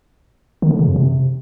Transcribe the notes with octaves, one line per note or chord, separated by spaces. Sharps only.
D#3
D3
C#3
F#2
C3